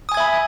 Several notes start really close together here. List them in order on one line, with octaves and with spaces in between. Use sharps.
D#6 G#5 G#6 E5 B5